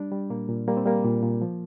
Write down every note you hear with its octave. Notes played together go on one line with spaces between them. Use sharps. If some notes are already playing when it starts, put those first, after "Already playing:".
Already playing: G3 D4
G3
A#2 A#3
A#2
G3 A#3
C4
G3 A#3
A#2
A#2
F3